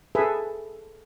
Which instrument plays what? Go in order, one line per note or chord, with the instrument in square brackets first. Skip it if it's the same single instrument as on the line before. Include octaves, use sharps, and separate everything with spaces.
[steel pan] G#4 A4 B4 E5